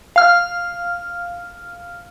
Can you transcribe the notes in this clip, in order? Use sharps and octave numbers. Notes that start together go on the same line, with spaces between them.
F5 F6